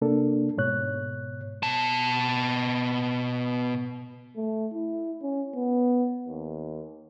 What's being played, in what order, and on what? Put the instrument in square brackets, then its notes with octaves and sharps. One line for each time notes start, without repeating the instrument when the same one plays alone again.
[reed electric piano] C3 A#3 D4 A4
G#2 B2 C#5 F#6
[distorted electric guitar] B2 A5
[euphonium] A3
E4
C#4
B3
D#2